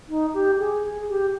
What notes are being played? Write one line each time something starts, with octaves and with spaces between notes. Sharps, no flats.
D#4
G4
G#4
G#4
G4